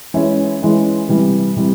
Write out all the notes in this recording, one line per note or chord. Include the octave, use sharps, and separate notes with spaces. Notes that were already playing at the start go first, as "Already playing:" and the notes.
E3 G#3 C#4 E4
E3 G#3 C#4 E4
C3 E3 G3
C3 E3 G3